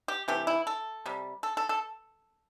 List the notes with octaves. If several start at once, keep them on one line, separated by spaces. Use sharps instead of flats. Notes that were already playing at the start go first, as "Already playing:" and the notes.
G4
C3 E3 A3 G4
E4
A4
C3 G3
A4
A4
A4